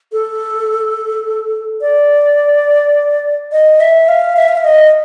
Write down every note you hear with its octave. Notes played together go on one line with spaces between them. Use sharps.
A4
D5
D#5
E5
F5
E5
F5
E5
D#5